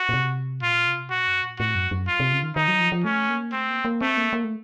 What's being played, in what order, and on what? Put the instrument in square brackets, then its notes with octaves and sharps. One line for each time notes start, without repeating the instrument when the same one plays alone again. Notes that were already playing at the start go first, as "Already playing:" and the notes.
Already playing: [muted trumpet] F#4
[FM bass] A#2
C3
[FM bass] A#2 [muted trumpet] F4
[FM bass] C3
[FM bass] A#2 [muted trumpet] F#4
[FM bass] F#2
A#2
[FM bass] A2 [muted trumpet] F#4
[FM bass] F#2
F#2
[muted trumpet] F4
[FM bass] C3
C#3
D#3
[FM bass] D#3 [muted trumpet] D#4
[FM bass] F#3
F3
F3
[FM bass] A3 [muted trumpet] C#4
[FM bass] A#3
[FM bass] A3 [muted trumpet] C4
[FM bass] A#3
A#3
[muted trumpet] A3 [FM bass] C4
[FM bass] A#3
A#3
A3